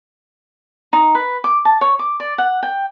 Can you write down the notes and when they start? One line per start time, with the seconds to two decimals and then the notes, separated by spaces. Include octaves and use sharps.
0.93 D#4
1.15 B4
1.44 D6
1.65 A5
1.81 C#5
1.99 D6
2.20 D5
2.38 F#5
2.63 G5